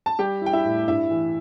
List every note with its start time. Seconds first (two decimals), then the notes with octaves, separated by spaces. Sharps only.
0.06 A5
0.19 G3 G4 G5
0.42 E4
0.46 G5
0.53 E4 E5
0.65 A2
0.87 G2 E4 E5
1.11 E3